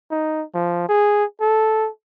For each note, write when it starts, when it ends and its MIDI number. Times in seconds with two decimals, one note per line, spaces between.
0.11 0.43 63
0.54 0.87 53
0.89 1.24 68
1.40 1.89 69